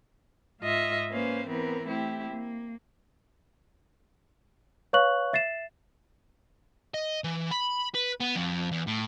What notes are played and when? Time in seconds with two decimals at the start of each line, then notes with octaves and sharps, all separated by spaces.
0.61 G#2 F4 D#5 E5
1.10 A#3 C#4 B4 C5 F5
1.48 E3 B3 C4 A#4 B4
1.86 A3 C4 E4 G4
2.30 A#3
4.93 B4 C#5 F5 C#6 F#6 F#7
5.33 E5 A6 C7 E7
6.94 D#5
7.24 E3
7.51 B5
7.95 B4
8.20 B3
8.36 F2
8.72 E2
8.87 A2